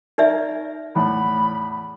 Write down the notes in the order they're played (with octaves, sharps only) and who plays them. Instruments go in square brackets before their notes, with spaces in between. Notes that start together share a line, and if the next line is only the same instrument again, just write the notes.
[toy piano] D#4 D5 E5 [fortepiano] A#4
[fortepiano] E2 A2 [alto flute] B5